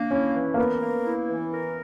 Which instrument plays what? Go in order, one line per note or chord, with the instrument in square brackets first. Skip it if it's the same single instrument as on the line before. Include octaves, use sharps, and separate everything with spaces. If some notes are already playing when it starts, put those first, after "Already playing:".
Already playing: [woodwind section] A#3 [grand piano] D4
[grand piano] C#4 [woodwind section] E4
[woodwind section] E3
[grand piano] A#3
[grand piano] B3 [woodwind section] A#4
[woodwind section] A#3
E4
E3
A#4